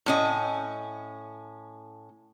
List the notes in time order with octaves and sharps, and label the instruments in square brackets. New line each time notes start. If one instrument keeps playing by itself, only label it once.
[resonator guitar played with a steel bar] A2 C#4 D#5